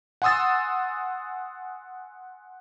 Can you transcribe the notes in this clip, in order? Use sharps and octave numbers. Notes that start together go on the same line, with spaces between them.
F#5 G#5 C6 D#6 E6 A6